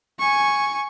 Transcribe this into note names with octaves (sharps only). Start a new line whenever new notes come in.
G#5 C#6